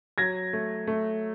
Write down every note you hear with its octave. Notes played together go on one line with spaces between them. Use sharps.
F#3 G#6 A#6
A3
A3